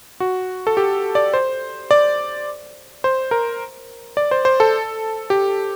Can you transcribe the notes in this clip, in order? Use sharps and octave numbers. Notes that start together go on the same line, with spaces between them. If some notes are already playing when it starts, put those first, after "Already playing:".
F#4
A4
G4
D5
C5
D5
C5
A#4
D5
C5
C5
A4
G4